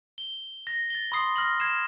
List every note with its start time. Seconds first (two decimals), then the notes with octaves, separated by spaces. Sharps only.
0.18 G7
0.67 A#6
0.90 A6 G7
1.12 B5 C6 D#6 C7
1.36 F6 A#6 F#7
1.60 F6 G#6 C7 E7